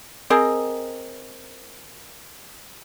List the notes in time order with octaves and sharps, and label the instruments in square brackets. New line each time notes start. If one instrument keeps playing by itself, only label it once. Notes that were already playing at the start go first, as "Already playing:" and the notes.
[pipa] C4 G#4 A#4 D#5